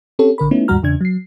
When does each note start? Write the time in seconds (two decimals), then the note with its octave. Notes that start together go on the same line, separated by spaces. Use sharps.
0.19 C4 C#4 G4 A4 C#5
0.38 A#1 D3 A#4 B5
0.51 A3 B3 C#4 D#4 E4
0.68 D#2 G#2 G3 F#4 A#5 F6
0.83 E2 C#3 D4 G#6
1.01 F#3 C7